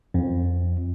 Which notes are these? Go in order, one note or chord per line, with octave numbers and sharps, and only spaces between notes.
F2